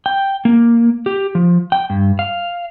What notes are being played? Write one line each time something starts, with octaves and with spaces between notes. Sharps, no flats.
G5
A#3
G4
F3
G5
G2
F5